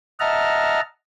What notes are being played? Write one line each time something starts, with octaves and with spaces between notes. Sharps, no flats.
D#5 E5 F#5 A5 A#5 F6